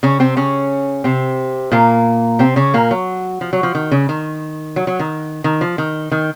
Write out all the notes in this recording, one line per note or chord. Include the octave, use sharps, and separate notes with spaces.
C#3 C#4
C3 C4
C#3 C#4
C3 C4
A#2 A#3
C3 C4
C#3 C#4
A#2 A#3
F#3
F3
F#3
F3
D#3
C#3
D#3
F#3
F#3
D#3
D#3
F3
D#3
D#3